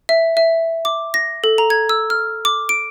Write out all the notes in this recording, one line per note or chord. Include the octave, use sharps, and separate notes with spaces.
E5
E5
D6
A#6
A4
A#5
G#6
E6
F6
D6
D7